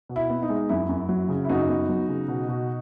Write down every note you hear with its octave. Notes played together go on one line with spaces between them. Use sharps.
B2
E4
B3
D#4
G#3
F#2 E4
F#2
F#3
C#3
E4
F#2 D#4 F#4
B3
F#3
C#3
B2
B2